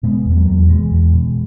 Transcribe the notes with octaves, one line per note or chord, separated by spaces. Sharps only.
B2 G#3 B3
E2
B3
F#3 A#3
E2
B2 E3 G#3
E2
B2